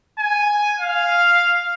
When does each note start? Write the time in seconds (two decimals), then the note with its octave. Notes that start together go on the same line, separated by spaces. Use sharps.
0.19 G#5
0.80 F5